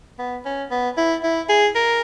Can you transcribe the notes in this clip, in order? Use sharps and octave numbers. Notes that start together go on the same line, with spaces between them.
B3
C#4
B3
E4
E4
G#4
A#4